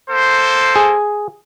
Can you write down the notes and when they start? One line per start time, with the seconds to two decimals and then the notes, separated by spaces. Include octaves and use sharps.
0.10 A#3 A4 C5
0.76 G#4